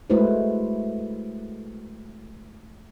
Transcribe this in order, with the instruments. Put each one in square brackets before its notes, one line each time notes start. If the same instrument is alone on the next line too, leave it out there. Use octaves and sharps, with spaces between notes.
[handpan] G#3 A3 E4 F#4 B4 C5